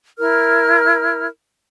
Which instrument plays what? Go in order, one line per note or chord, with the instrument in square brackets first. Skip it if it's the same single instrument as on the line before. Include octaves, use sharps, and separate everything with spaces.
[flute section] E4 A#4 F6